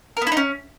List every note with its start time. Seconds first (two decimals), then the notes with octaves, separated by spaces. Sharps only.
0.17 A#4
0.22 B3
0.27 E4
0.32 D#4
0.37 C#4